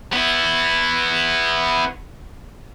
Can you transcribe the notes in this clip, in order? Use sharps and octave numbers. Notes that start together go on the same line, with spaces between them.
B3 E4